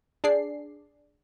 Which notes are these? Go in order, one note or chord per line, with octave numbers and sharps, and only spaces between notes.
D4 G#4 D5 C7